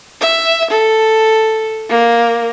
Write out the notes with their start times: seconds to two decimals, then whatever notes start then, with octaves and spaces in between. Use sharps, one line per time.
0.21 E5
0.70 A4
1.90 A#3